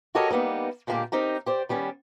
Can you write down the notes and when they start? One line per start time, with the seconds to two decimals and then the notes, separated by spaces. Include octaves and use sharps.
0.15 F#4 G4 A4 A#4 C#5 D#5
0.30 G3 A#3 B3 D#4
0.87 A#2 D3 G#3 A#3 G4
1.12 C4 D#4 G4 A#4
1.46 G4 C5 D5
1.69 D#3 G3 B3 C#4